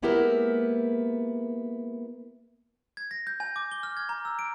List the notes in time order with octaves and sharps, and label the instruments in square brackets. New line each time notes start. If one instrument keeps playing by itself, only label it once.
[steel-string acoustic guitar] G#3 A#3 B3 E4 G4 A#4
[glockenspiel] G#6
A#6
G6
G#5
D6
G7
F6
G#6
A#5
E6
D7